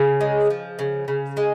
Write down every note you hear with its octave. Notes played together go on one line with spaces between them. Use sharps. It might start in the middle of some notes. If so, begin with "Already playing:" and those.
Already playing: C#3
G#3
F3
C#3
C#3
G#3